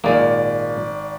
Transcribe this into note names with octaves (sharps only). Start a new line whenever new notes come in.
G#1 A#2 G#3 A#3 D5